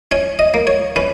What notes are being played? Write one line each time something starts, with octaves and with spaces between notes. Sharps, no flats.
C#4 C#5
D#5
A#3
C#5
C#4 B4